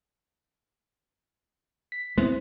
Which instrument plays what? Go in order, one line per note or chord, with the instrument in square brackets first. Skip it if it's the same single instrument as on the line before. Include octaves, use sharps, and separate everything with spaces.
[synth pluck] B6
[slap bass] G#3 B3 [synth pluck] C4 E4 C5